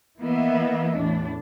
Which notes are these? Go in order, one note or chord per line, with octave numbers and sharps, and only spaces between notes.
E3 A#3 B3 D#5 E5
E2 A2 D4